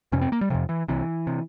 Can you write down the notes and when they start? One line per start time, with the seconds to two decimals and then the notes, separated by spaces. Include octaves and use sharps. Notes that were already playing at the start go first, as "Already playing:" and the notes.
0.12 F2 C3 C#4
0.21 C4
0.32 A#3
0.41 G3
0.50 F2 C3 F3
0.69 E3
0.88 C2 C3 E3
1.27 C3